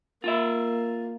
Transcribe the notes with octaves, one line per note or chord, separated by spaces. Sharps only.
A#3 F4 E5